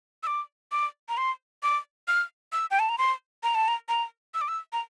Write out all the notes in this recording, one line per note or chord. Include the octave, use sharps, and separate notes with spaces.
E6
D6
D6
A#5
C6
D6
F6
E6
G5
A5
A#5
C6
A#5
A5
A#5
A#5
E6
D6
E6
A#5